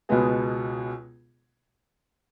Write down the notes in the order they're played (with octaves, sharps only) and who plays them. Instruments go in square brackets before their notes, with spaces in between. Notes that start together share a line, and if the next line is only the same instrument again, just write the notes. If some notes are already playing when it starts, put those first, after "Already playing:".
[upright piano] C#2 B2 G#3 B3 G#4